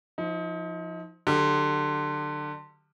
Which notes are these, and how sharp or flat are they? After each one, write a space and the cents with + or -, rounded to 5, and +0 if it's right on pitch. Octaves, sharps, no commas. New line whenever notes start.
F3 +0 D#4 +35
D3 +25 F#3 +0 G4 +20